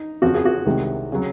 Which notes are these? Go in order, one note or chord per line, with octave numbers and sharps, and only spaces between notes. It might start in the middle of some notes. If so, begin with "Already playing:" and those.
Already playing: D#4
F2 C#3 F3 F#4
G#4
F#4
C2 C3 D#3 G#3
C#3 F#3